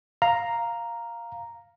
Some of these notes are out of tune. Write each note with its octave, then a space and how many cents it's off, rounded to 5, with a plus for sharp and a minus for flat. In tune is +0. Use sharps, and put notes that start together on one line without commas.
F5 +0 A#5 +0